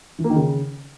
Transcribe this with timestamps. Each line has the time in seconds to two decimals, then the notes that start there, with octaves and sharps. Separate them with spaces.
0.19 E3
0.24 A#3
0.30 D#3
0.36 C#3